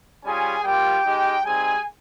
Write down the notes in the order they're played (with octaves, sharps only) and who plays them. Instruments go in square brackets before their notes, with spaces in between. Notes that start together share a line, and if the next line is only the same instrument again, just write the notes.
[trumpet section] G3 C#4 F4 G#4 G#5
G3 A#3 F4 G4 G5
G#3 D#4 G4
G3 C4 D#4 G#4 G#5